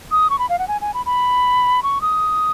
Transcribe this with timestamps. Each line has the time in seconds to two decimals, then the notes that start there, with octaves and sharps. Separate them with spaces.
0.12 D#6
0.30 C#6
0.39 B5
0.49 F5
0.59 F#5
0.68 G#5
0.81 G#5
0.94 B5
1.06 B5
1.83 C#6
2.01 D#6